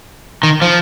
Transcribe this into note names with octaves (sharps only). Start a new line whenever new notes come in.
D#3
F3